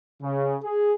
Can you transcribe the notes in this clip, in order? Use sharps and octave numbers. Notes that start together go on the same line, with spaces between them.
C#3
G#4